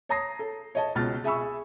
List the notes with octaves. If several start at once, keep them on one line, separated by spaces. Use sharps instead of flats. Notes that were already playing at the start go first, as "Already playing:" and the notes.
C#5 A5 A#5 D#6 A#6 C7
A4
C#5 D#5 A5
C#2 B2 F6 A6
G#4 E5 G#5 B5 C#6 E6